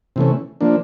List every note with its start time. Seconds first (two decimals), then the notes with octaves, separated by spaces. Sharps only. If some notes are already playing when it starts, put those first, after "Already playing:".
0.16 C3 E3 A3 C#4
0.61 F3 A#3 D4